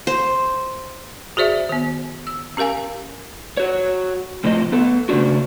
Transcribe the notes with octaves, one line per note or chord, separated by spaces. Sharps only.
C5
F#4 G#4 C5 D5 E5
D#3 B3
E6
C#4 G4 A#4 F5 G#5
F#4 C#5
A2 C3 F3 D#5
B3 A4
C#3 A3 C#4 D4 F#4